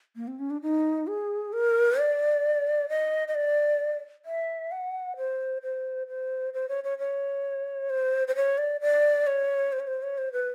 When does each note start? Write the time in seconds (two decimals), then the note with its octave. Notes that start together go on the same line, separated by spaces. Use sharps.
0.16 A#3
0.28 C4
0.39 C#4
0.50 D4
0.62 D#4
1.07 G#4
1.53 A#4
1.98 D5
2.89 D#5
3.28 D#5
3.35 D5
4.25 E5
4.72 F#5
5.17 C5
5.63 C5
6.08 C5
6.54 C5
6.69 C#5
6.84 C#5
6.99 C#5
7.90 C5
8.28 C5
8.36 C#5
8.58 D5
8.81 D5
9.27 C#5
9.72 C5
9.80 C#5
9.87 C5
10.03 C#5
10.18 C5
10.33 B4